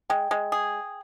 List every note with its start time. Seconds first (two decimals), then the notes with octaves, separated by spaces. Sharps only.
0.10 G#3 G5
0.31 G#3
0.52 G#4